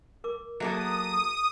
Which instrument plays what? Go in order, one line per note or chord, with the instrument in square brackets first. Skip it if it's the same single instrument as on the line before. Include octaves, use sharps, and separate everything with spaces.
[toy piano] A#4 D6
[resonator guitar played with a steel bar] F#3 A#3 A4 [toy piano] G#4 C5 E5 [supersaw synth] D#6